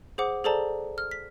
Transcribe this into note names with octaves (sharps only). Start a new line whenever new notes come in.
G#4 C5 F#5 D6
G#4 A4 C5 D5 A5 A#5
F6
B6